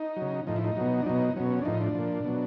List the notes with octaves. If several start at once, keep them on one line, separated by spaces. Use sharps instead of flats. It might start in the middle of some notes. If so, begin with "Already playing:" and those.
Already playing: D#4
F#3
C#3
A2 F3 D#4
E4
D#4
B2 F#3
D4
B2 F#3 D#4
B2 F#3 C#4
C#4
D4
A2 F3 D#4
D4
A#2 F3
B2 F#3